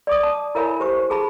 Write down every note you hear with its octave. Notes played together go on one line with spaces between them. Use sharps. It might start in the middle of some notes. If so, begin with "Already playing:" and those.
D5 D6 D#6
A5
E4 A#4 C#5 E5 G#5 B5
G4 C5 C#6
G#4 A5 B5